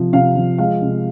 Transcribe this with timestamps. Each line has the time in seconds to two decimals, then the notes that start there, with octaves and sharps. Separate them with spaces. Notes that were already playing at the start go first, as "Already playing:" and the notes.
Already playing: C3 F3
0.13 C3 F5
0.36 F3
0.58 G#3 F5
0.82 C3